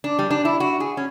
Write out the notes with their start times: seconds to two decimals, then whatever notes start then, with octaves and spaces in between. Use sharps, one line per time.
0.04 D4
0.19 G3
0.31 D4
0.45 E4
0.60 F#4
0.80 G#4
0.97 C#4